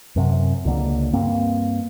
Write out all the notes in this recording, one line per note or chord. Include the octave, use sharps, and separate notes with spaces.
F#2 C3
C#2 D3 A#3
G2 A#3 C4